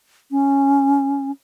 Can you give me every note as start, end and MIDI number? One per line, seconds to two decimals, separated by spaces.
0.31 1.31 61